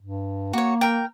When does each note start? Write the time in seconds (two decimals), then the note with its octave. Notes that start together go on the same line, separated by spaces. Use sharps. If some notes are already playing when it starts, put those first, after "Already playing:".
0.01 G2
0.53 A#3 F#4 C#5
0.81 A#4 G5